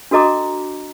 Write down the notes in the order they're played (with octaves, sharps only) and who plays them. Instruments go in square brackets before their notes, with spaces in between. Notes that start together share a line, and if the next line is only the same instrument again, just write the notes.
[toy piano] D4 F#4 A4 D#5 A#5 D6